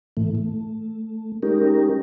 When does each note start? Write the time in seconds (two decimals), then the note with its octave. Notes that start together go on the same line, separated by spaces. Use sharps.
0.17 A2 E3 A3
0.35 A3
1.43 G#3 C#4 D#4 G4 A#4